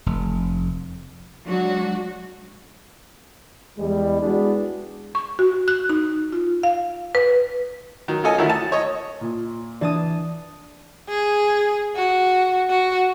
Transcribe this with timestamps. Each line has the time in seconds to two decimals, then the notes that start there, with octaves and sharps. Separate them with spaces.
0.06 F1
1.45 F#3 G#3 D4 F#4
3.78 E2 G3 G#3
4.22 G#3 B3 D4 E4 F#4 G#4
5.15 C#6
5.39 F#4
5.68 F#6
5.89 D#4
6.33 F4
6.63 F5
7.15 B4
8.08 D#3 F#3
8.24 C#4 F4 A4 D#5 G#5
8.38 D3 D#3 F#3 A3 E4
8.50 A5
8.72 C#5 D#5
9.21 A#2
9.81 E3 D4 A5 D#6
11.09 G#4
11.96 F#4
12.70 F#4